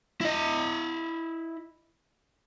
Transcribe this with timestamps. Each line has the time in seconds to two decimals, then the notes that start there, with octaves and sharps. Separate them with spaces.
0.21 E4 D#5